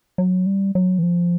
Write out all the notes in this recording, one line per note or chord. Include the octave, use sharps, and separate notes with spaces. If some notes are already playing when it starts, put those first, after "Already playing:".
F#3
G3
F#3
E3
F3